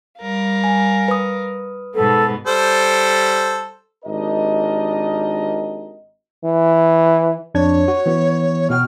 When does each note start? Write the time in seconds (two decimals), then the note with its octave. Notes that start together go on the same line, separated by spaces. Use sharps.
0.20 G3 A#4 F5
0.64 G#5
1.08 B4 D#6
1.95 G#2 B2 B3 A4
2.46 G3 A4 C5
4.05 G#1 D4 G4 A#4 D#5
6.44 E3
7.55 F2 D4 C#5 G#6
7.88 F#4
8.06 E3 B3
8.70 B2 F#4 G5 F6